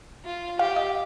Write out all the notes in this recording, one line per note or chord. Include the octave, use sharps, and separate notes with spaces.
F4
G4 F5
D#5